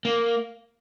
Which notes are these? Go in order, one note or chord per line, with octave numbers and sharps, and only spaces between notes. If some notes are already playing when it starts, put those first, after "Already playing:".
A#3